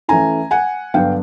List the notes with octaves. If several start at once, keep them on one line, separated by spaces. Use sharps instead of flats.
E3 A3 C#4 E4 G#5 A#5
F#5 G#5
G2 D3 F#3 B3 D4 F5 G5